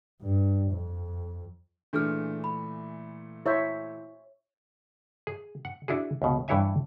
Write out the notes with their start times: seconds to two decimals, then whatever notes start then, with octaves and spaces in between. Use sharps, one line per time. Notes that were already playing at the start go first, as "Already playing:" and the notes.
0.21 G2
0.71 F2
1.93 A#2 E3 A3 D4 G#4 F6
2.44 B5
3.46 E4 C5 C#5 E5 G6
5.27 G#4
5.65 F#5
5.88 D4 E4 F#4 G#4
6.22 C#2 B2
6.48 G2 E3 E4 C#5 E5 G#5